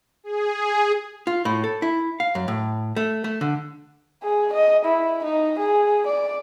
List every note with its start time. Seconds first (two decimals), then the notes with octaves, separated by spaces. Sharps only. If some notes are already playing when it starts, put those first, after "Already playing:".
0.24 G#4
1.27 F4
1.45 A2
1.64 A4
1.82 E4
2.20 F5
2.35 F#2
2.48 A2
2.96 A3
3.24 A3
3.41 D3
4.23 G#4
4.53 D#5
4.85 E4
5.24 D#4
5.58 G#4
6.06 D5